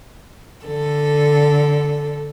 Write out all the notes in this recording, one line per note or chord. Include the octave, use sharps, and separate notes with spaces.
D3 A4